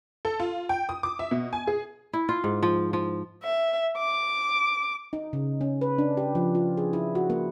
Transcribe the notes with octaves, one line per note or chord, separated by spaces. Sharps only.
A4
F4
G5
D#6
D6
E5
B2
G#5
G#4
E4
F4
G#2
F3
F3
E5
D6
D#4
C#3
C#4
B4
D4
G4
F3
F4
G#4
E4
F#4
A#3